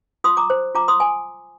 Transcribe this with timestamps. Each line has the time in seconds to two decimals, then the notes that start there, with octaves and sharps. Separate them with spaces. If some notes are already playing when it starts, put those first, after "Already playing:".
0.24 F4 C6 D#6
0.37 A#5 D6
0.50 C5
0.75 F4 A#5 D6
0.88 C6 D#6
1.00 G#5